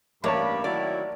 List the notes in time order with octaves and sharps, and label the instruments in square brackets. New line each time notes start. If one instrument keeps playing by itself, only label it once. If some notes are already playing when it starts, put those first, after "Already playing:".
[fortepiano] A1 C#5 A5 [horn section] G2 D5 B5 [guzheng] A#3
[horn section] D#3 F#3 E4 [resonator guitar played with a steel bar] D5